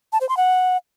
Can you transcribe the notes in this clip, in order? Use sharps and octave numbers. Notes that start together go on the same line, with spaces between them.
A5
C5
C6
F#5